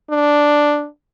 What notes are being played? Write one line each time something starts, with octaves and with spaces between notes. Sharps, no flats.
D4